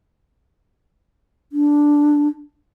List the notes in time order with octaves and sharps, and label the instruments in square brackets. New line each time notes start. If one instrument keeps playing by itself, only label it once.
[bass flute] D4